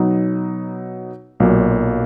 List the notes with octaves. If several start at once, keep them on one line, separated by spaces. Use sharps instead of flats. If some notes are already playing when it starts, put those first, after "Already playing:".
Already playing: B2 F#3 B3 D#4
B1 A#2 F#3 A#3